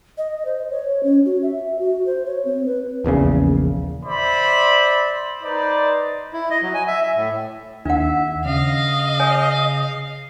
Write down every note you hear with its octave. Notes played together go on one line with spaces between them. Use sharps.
D#5
C5
C#5
C#4
F#4
E5
F#4
C5
C#5
C4
B4
D#1 A#1 E2 C#3
C5 D5 E5 B5
D#4 B4 C5 D5
E4
D#5
F#3
G#5
E5
E5
A2
D#2 D4 E5 F#5
C#3 D#5 F5
C#5 G#5